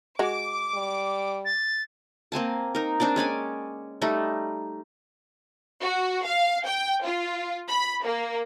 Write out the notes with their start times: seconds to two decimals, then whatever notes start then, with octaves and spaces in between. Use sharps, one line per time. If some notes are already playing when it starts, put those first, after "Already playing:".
0.19 G#3 F#4 D6
0.74 G3
1.45 A6
2.32 A#3 C4 G#5 A5
2.75 D#4 A#4
3.00 C4 D4 C5 D5
3.16 G#3 C#4 D5 G#5
4.02 G3 A3 D#4
5.82 F#4
6.25 F5
6.67 G5
7.05 F4
7.69 B5
8.04 A#3